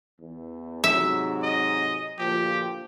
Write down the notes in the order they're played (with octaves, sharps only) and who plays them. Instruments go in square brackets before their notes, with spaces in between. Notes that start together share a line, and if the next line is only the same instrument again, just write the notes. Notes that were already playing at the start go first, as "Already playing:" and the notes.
[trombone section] E2
[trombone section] G#2 C3 F#3 [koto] E5
[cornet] D#5
[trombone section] D2 A#2 F3 [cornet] G4